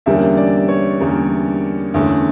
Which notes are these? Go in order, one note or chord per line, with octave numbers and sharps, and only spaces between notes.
E2 D3 G3 A#3 C#4 E5
D5
C#5
E2 D3 G3 A#3 C#4 A#4
E2 D3 A3 C#4